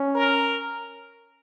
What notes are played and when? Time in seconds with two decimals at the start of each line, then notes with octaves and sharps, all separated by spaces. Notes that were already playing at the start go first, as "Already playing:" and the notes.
Already playing: C#4
0.15 A#4